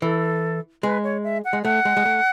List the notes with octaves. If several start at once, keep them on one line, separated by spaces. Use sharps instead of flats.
E3 A4
G#3 B4
C#5
E5
F#5
G#3
A3 F#5
G#3
G#3
A3